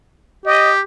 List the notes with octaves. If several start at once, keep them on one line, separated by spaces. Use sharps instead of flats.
G4 D#5